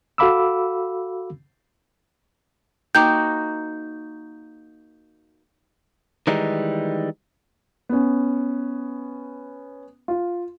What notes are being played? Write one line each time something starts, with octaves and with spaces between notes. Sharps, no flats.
F#4 A4 F5 B5 D6 E6
A#3 D#4 F#4 G5 A#5 D6 G6
D#3 E3 G3 G#3 D#4
B3 C#4
F4